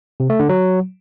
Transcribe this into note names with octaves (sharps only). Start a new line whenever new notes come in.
C3
A3
D3
F#3